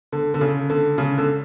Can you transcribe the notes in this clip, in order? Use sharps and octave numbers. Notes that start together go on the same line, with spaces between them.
D3
D3
C#3
D3
C#3
D3